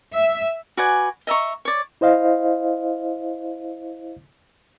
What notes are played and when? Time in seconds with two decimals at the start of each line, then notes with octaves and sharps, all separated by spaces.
0.13 E5
0.77 F#4 B4 D5 G#5
1.27 D#5 E5 A#5 C#6
1.65 C#5 D5
2.01 E4 C5 D#5 F5